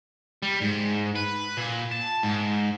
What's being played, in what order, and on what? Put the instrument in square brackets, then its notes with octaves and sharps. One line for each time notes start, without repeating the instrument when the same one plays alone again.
[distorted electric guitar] G3
G#2
B4
A#2
A5
G#2